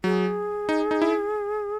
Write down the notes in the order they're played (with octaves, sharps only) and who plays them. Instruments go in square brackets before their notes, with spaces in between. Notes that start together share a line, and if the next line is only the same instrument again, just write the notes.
[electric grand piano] F#3 [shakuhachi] G#4
[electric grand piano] D#4
D#4
E4